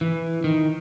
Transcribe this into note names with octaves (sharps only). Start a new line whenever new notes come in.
E3
D#3